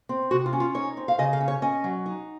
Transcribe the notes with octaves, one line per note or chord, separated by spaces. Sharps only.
C4
C3 F#4
F4
C#4
F4
D#4 C#5
C4
F5
C#3 D#5
F5
C#4
C#5
C#4 D#5
F#3
D#4